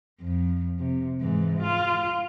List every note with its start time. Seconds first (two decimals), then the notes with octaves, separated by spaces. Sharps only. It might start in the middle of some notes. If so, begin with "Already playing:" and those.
0.21 F2
0.79 C3
1.21 G#2 E3
1.63 F4